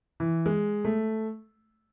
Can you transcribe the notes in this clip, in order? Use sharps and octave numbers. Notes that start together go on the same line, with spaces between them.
E3
G#3
A3